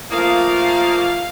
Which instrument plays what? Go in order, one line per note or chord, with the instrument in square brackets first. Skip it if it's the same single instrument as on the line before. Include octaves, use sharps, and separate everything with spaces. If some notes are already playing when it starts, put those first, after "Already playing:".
[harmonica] F3 [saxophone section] A3 A#3 [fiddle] F5 [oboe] D#6